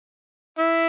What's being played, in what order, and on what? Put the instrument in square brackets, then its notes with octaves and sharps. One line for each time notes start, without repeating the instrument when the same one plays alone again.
[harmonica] E4